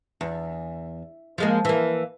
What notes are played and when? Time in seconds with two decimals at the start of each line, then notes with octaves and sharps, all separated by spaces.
0.21 E2
1.38 F3 G#3 A#3
1.65 E3 A#3